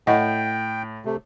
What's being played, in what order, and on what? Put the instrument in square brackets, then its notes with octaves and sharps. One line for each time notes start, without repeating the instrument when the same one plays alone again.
[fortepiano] A2 [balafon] D#5 F#5 C#6 [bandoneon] G5
[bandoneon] C3 A3